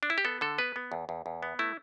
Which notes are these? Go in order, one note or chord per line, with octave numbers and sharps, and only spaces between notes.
D4
E4
G4
B3 A4
D3 A4
B3 B4
B3
E2
E2
E2
B3
A3 E4